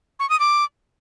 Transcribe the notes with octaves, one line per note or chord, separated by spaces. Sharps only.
C#6
D#6
D6